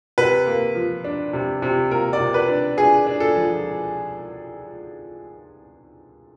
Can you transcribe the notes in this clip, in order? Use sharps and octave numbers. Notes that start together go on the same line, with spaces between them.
C3 B4
A#3
F3
D4
C3
C3
A#3 A#4
D5
C3
B4
D4
D4 G#4
D4
A4
F3